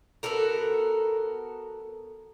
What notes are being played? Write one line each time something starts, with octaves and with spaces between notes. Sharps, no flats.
B3 F#4 A4 A#4